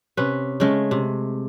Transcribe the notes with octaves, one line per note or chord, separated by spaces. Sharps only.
C3 C#4 B4
C#3 G#3 A3
C3